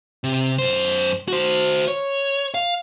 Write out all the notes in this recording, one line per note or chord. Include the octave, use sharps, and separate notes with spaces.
C3
F#2 C5
F#4 C5
C#5
F5